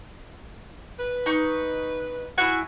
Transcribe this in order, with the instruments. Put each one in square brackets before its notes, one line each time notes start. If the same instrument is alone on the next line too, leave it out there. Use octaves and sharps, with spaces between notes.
[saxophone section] B4
[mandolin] D#4 C#6 G6
[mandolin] E4 G#5 [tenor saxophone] F#4